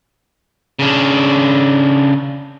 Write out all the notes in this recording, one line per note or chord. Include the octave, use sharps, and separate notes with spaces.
C#3 D4